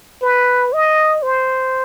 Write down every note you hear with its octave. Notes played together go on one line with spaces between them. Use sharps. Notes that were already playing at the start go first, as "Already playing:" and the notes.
B4
D#5
C5